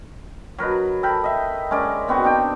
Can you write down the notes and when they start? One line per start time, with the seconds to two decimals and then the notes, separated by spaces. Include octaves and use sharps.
0.58 F#3 A#4 B4 D#5
1.03 A4 A#4 G5 B5
1.24 D#5 E5
1.71 G#3 C#4 A#4 D5
2.08 D#3 B3 C4 F#4
2.24 D4 D#4 G5